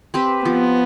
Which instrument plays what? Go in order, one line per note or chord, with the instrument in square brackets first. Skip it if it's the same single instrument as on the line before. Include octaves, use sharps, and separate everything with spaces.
[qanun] C4 G4 B4
[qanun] F3 [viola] B3